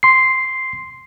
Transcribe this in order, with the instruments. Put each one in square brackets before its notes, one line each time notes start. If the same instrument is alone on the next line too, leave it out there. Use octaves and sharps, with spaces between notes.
[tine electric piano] C6 C7